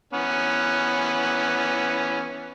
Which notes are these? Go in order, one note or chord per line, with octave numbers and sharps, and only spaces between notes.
E3 B3 C#4